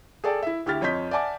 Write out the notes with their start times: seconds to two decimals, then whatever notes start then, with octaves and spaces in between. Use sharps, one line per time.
0.24 G#4 A4 D5 G5 A5
0.43 E4 E5
0.66 D2 E4 G4 F6 A6
0.81 F2 C#5 D#5 C6 G6 B6
1.11 D5 E5 F#5 G#5 A5 D6